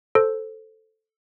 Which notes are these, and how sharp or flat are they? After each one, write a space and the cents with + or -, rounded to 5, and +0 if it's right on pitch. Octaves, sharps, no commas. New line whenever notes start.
A4 +0 C5 +5